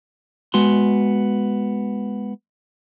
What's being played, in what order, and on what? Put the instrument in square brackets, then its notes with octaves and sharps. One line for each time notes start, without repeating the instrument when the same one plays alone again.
[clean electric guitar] G#3 B3 F#4 C6